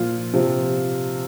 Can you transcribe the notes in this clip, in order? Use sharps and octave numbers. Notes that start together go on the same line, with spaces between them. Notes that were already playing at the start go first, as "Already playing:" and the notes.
Already playing: A#2 F3 F4
C3 F3